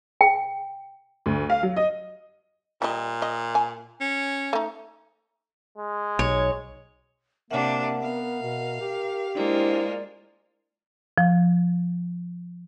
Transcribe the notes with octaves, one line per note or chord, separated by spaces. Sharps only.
G5
D2
F5
F#3
D#5
A#2 G3 D#5
D#5
G#5
C#4
A3 D#4
G#3
B1 C#5
C3 A#3 D4 A#4 E5 F#5
B3 F5
B2
G4
G#3 A#3 D4 E4 F4 C5 D5
F3